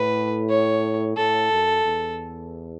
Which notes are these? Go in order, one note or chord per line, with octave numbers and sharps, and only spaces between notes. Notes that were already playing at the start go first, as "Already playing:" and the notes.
Already playing: A2 B4
C#5
A2 A4
F#2
E2